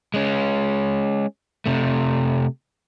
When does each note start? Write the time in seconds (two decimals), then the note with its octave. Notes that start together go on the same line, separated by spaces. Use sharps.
0.14 G#3 C#4
1.66 C3 A3